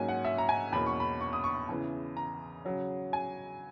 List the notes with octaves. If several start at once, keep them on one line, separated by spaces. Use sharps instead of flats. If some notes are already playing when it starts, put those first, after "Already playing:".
Already playing: G#2 F#3 A#3 C#4 G#5
F#5
E5
A#5
G#5
E2 B2 A#3 C#4 B5
C#6
B5
C#6
D#6
C#6
E2 C#3 E3
A#5
C#3 F#3 C#4
G#5